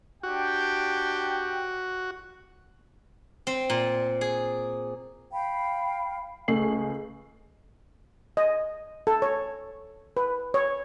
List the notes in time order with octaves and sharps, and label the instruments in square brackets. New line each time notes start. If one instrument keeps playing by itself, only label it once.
[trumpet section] D4 G4 G5 [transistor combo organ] F#4
[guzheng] C4
A#2
G#4
[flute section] F5 G5 B5
[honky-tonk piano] C#2 A3 G#4 C7 F#7
[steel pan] D#5
A4
C#5
B4
C#5